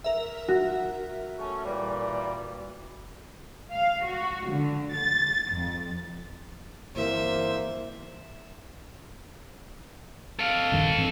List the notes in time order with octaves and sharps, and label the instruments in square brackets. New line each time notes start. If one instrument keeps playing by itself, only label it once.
[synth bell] A#4 E5
[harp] F#4
[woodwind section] A3 C#4
A#2 E3 G3
[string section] F5
F#4
D3
A6
F2
[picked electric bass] G1 E3 [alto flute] A#3 [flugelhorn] C5 [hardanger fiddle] E5
[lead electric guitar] A4 F5
[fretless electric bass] D#1 G2 D#3
G2 E3 C4